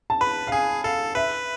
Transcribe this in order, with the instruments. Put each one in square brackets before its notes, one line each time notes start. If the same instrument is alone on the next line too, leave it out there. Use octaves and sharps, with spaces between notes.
[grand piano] A5
[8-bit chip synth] B4 [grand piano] B5
[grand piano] F5
[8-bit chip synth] G#4 [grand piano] G#5
[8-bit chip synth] A4 [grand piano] F5
[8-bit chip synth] B4 [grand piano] E5